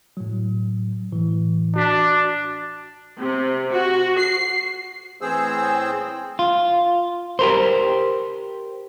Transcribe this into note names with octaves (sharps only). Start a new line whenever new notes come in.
A2 F#3
A2 E3
D4 F#4 B6
C3
F#4
C7
A2 E3 C4 G#4 C5 E6
F4
G4 A#4 C5